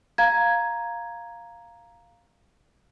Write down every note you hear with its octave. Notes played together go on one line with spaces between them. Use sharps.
F5 A#5 G#6